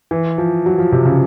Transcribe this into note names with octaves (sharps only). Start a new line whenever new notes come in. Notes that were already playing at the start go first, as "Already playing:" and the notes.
E3
F3
F#3
F3
C3
C#3